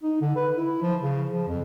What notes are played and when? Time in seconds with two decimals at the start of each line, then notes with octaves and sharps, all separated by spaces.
0.03 D#4
0.21 D3
0.36 B4
0.56 E4
0.82 F3
1.03 C#3
1.33 F3
1.48 F2